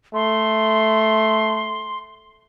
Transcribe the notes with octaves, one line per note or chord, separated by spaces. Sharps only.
A3 C6